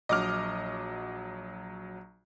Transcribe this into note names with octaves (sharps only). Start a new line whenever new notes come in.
A#1 F#3 D#5 D6 F6